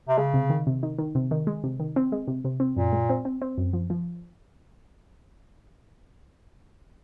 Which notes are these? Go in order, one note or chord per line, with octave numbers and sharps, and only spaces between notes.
C3
C#3 G#3
C3
D#3
C3
D#3
D#3
C3
D#3
G#3
C3
D#3
C4
G#3
C3
C3
C4
F#2 A#2
G#3
C4
C4
C4
F#2
F3
F3